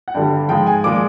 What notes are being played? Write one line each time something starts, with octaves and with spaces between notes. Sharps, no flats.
F#5
G2 D3 G3 G5
G#2 F3 G#3 G5
G#5
A#2 F3 G#3 D6